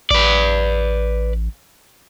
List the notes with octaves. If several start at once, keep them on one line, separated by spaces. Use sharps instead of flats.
A1 B4 D5